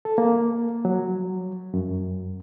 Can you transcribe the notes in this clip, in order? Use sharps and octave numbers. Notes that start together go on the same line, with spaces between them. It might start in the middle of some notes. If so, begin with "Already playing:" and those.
A4
A#3
F#3
F#2